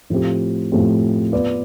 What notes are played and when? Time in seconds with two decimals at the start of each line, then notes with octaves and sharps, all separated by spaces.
0.10 A2 F3 A3 C4 G4
0.72 A2 F3 A3 C4 G4
1.32 B3 F4 B4 D5